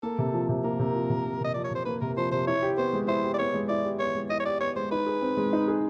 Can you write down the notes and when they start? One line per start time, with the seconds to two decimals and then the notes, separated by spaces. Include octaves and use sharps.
0.03 A#3 A4
0.18 C3
0.33 F3
0.49 C3
0.64 A#3 A#4
0.79 C3
0.95 F3
1.10 C3
1.25 A#3
1.41 C3 D#5
1.54 F3 D5
1.64 C#5
1.71 C3 C5
1.86 A#3 B4
2.01 C3 A#4
2.17 F3 C5
2.32 C3 C5
2.47 E4 C#5
2.63 G4
2.77 B3 C5
2.93 G#3
3.08 E4 C5
3.24 G4
3.34 D5
3.39 B3 C#5
3.54 G#3
3.69 E4 D5
3.84 G4
3.99 B3 C#5
4.15 G#3
4.30 E4 D#5
4.40 C#5
4.46 G4 D5
4.60 B3 C#5
4.76 G#3 C5
4.91 D#4 B4
5.07 G#4
5.22 C4
5.37 G#3
5.53 D#4
5.68 G#4